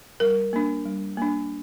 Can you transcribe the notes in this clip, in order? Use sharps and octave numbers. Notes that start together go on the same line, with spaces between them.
G3 A#4
A#3 D4
G3
A#3 D4